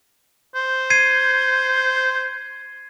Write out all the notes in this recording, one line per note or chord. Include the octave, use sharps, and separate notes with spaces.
C5
G#6 C7 D#7